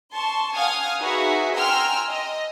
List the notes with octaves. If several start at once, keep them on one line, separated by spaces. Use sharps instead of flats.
A5 C6 C#6
F5 F#5 G#5 D#6 F6 G#6
D#4 F#4 G#4 B4 E5
G5 G#5 A#5 C6 E6 F6
D#5